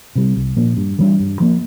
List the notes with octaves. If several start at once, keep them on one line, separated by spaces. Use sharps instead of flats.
C3 G3
C2
A#2 F3 A#3
G2
E3 G3 D4
G2
F3 A#3